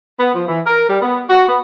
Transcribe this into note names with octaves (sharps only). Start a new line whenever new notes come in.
B3
F3
E3
A#4
G3
B3
F#4
B3